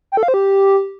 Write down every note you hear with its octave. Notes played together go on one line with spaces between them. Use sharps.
G5
A4
F5
C5
G4